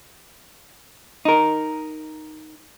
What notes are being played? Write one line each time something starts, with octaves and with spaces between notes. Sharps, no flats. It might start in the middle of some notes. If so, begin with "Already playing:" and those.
D#4 A#4